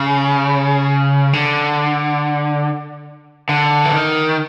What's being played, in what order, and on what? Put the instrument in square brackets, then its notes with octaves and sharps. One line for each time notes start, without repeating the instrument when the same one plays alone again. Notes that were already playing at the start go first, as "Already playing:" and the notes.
Already playing: [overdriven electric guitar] C#3
D3
D3
E3
D#3